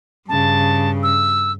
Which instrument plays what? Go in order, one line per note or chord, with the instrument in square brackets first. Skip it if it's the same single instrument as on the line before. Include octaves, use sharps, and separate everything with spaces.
[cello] G2 C#3 [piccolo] A5
[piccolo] E6